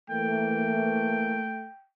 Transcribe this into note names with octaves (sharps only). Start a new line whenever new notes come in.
E3 A3 A#3 G5